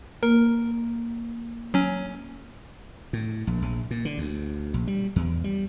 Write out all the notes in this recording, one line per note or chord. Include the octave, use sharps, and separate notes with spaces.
A#3 A#4
F#3 C#4
A2
A#1
A#1
A#2
D3
D2
A#1
G3
E2
G3